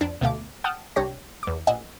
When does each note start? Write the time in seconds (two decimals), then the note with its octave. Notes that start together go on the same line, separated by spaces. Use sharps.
0.01 F2 D4
0.21 D2 B2 A3 F5 D6
0.64 F#5 G5 A5 D#6 F6
0.96 C2 D4 G4 C#5 A#6
1.43 E2 D6
1.67 A#1 D#5 F#5 G#5 E6